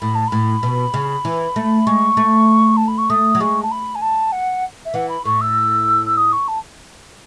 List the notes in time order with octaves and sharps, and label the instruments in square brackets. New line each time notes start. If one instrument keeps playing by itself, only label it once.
[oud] A2 [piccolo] B5
[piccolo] A5
[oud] A2 [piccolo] B5
[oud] B2
C#3
E3
A3
[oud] G#3 [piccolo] C#6
[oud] A3
[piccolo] A5
B5
C#6
[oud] A3 [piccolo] D#6
[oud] F#3
[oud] G#3 [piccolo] C#6
[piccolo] A5
B5
G#5
A5
F#5
E5
[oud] E3 [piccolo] F#5
[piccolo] B5
[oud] A2 [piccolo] C#6
[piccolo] E6
E6
D#6
C#6
A5